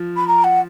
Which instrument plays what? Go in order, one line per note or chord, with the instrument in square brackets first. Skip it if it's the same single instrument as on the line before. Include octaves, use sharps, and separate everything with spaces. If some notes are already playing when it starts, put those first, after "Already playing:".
Already playing: [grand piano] F3
[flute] B5
A#5
F#5